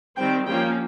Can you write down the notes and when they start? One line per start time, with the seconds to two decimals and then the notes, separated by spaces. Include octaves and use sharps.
0.17 D#3 G3 C4 G5
0.45 F3 A#3 C#4 G5